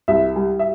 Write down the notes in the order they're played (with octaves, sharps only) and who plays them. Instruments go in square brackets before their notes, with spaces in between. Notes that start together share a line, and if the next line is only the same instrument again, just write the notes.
[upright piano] C2 E5
G3
E5